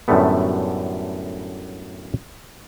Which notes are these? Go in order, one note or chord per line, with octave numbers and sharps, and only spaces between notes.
F#2 A2 D3 G3 A3 B3